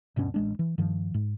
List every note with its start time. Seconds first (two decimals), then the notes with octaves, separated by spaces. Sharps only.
0.16 D1 G2 B2 C#4
0.34 A1 G#3 D4
0.59 E3
0.78 G2 D#3 F3
1.14 G#2